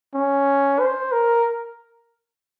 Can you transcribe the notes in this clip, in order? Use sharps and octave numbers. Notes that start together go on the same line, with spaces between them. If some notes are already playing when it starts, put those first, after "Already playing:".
C#4
C5
A#4